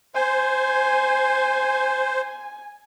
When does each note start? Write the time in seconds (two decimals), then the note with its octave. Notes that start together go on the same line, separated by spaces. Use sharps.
0.15 C5 G#5